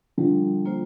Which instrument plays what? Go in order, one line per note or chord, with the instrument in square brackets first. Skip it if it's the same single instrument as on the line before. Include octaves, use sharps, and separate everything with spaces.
[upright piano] D3 F3 [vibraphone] G3
[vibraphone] A#3 F4 C5